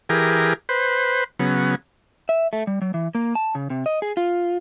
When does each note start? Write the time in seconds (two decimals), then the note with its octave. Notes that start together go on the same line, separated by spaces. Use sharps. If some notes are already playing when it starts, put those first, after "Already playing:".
0.09 E3 G4 G#4 A#4
0.69 B4 C5
1.39 C#3 F#3 B3
2.29 E5
2.53 A3
2.67 G3
2.82 F#3
2.94 E3
3.15 A#3
3.35 A5
3.55 C#3
3.70 C3
3.86 D#5
4.02 G#4
4.17 F4